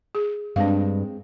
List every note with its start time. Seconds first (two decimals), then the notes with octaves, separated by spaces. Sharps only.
0.15 G#4
0.56 G2 G#3 C4 D4 F5